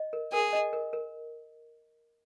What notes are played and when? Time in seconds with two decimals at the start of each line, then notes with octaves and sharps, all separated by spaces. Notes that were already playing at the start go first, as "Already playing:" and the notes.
Already playing: D#5
0.13 A#4
0.32 G#4 A#4
0.53 D#5
0.73 A#4
0.93 A#4